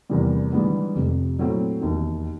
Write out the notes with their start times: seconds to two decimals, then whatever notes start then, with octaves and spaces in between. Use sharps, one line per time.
0.09 E2 C3 E3 G3 A#3
0.53 G#2 E3 G3 B3 D4
0.95 F1 F2 C3
1.37 A#2 F#3 A3 C4 E4
1.81 E1 D#2 D#3